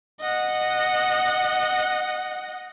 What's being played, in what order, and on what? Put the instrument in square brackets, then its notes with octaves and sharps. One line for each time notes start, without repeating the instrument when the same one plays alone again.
[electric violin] D#5 F#5